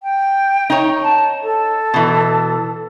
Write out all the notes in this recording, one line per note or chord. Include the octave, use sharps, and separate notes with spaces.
G5
D#4 C#5
A5
A4
B2 E3